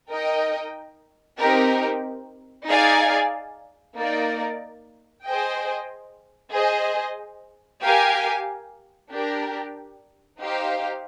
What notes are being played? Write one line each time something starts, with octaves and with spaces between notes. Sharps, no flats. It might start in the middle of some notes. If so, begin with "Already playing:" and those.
D#4 A#4 D#5 G5
C4 D#4 G4 A#4
D#4 G#4 D5 F5 G#5
A#3 D#4 A#4 D5
G#4 C5 D#5 G5
G#4 C5 D#5
G4 A#4 F5 G#5
D4 G4 A#4
D#4 G4 C5 F5